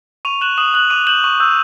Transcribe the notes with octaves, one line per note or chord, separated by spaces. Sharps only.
C#6 D#7 F7
F#6 E7 F#7
D#6 E7 F#7
F#6 E7 F#7
D6 D#7 F7
G6 E7 F#7
C#6
E6 G6